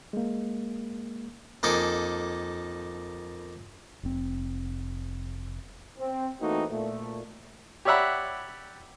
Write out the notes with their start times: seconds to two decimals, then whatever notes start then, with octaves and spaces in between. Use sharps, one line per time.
0.13 G#3 A#3
1.63 F2 A#3 D#4 A4 G#5 D6
4.03 F1 C4
5.99 C4
6.40 E3 A3 A#3 C4 D#4 F#4
6.70 A#2 A3
7.85 G4 C#5 D5 E5 F#5 B5